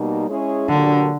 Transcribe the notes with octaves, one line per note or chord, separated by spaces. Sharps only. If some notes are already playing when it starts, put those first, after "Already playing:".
Already playing: B2 G3 A#3 D#4
G#3 C#4 E4 G#4 C#5
A#2 D3 F#3 A#3 D4 G4